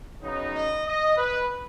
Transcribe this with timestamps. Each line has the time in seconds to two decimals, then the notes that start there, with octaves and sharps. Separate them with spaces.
0.21 C#3 F#3 B3 D#4
0.53 D#5
0.86 D#5
1.17 B4